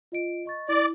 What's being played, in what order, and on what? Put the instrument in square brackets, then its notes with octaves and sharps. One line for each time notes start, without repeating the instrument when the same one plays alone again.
[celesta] F4 D#5 D7
D#5 C#6 A6
[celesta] E4 [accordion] D5